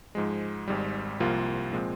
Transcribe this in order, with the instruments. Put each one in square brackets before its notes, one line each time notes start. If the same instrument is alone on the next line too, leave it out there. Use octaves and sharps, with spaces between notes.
[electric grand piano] G#2 F3 G#3
G#1 G#2 G3
C2 C3 F3 A#3 F4
A#2 F3 G#3 C4